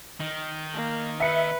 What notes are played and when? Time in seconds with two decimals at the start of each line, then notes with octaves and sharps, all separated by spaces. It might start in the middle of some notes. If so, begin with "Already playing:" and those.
0.20 D#3
0.74 A#3
1.20 B4 E5 C#7